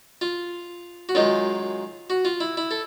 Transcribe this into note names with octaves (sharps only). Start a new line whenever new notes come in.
F4
F#4
F#2 D#3 G#3 F4
F#4
F4
E4
E4
A4